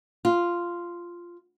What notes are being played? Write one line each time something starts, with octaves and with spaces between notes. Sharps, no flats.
F4